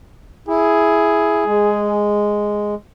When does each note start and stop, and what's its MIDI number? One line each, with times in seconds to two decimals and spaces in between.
0.48 1.44 64
0.48 2.07 68
1.46 2.75 56